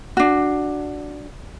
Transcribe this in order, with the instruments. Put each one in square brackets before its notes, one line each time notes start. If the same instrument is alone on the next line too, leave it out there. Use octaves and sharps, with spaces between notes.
[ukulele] D4 F#4